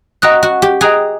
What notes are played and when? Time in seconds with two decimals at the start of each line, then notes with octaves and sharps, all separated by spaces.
0.22 F#4 D#5 G5 A#5 D#6 F#6
0.43 F#4
0.62 G4
0.81 G#4 D#5 G5 A#5 D#6 F#6